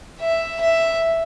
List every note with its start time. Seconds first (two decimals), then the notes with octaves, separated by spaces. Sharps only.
0.20 E5
0.61 E5